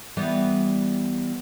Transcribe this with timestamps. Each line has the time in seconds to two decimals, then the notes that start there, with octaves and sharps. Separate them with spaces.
0.17 E3 G3 B3